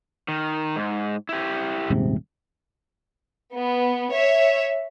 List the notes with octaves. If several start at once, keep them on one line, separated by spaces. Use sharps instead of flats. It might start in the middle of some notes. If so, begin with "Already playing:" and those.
D#3
G#2
E4 G4
D#1 G#2 C3
B3
C#5 E5